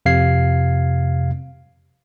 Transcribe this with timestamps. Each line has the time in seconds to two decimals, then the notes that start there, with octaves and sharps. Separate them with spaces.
0.06 F2 C3 F5 G#6 C7